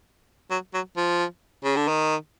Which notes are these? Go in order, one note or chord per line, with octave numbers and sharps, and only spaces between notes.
F#3
F#3
F3
C#3
D3
D#3